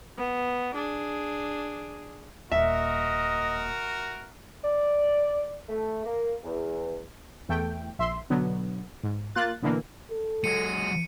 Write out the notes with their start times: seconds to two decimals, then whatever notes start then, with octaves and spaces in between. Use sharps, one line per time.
0.17 B3
0.75 D4 G#4
2.52 D#1 A#3 F#4 A#4 D#5 E5
4.64 D5
5.69 A3
6.05 A#3
6.44 E2
7.49 E2 A3 G5
7.99 A#1 E5 C6
8.30 B2 D3 F#3 B3
9.03 G#2
9.35 A#3 F4 F#6 A6
9.62 B2 D3 E3 A#3
10.10 A4
10.44 F#3 G#3 C#7 D#7